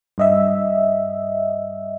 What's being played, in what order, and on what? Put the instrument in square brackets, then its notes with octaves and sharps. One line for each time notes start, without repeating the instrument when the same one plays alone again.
[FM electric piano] G2 D#5 E5